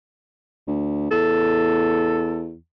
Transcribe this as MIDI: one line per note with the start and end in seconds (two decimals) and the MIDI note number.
0.67 1.09 38
1.11 2.56 40
1.11 2.47 69